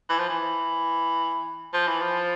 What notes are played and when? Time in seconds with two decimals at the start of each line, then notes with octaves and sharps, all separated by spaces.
0.09 E3
0.19 F3
0.30 E3
1.74 F3
1.87 E3
2.02 F3